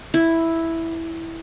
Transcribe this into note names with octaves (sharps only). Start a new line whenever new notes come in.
E4